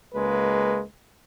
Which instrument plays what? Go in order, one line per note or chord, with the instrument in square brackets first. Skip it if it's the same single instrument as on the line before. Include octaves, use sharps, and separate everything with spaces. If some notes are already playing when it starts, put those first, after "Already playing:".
[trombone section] C#2 G#3 A#3 B4